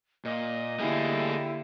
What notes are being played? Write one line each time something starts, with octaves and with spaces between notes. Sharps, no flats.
A#2 D#5
D3 A3 A#3 E4 G4 G#4 G#5